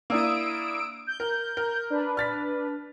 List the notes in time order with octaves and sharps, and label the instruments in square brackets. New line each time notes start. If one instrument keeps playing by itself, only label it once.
[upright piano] A#3 D4 E4 [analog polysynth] D#6 E6 D7
[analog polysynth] G6
[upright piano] A#4
A#4
[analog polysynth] D4 B4
[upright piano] F6 A6 B6